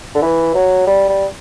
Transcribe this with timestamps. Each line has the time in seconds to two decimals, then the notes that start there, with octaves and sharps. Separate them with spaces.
0.15 D3
0.22 E3
0.55 F#3
0.87 G3
1.09 G3